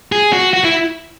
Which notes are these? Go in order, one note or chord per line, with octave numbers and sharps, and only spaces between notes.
G#4
F#4
F#4
E4